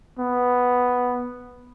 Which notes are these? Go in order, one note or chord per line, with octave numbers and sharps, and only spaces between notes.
B3